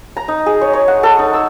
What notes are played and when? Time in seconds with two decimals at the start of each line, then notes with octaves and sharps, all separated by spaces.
0.17 A#5
0.28 D#4
0.46 G#4
0.61 C#5
0.73 C#5
0.88 F#5
1.03 A4
1.19 D#4
1.33 E6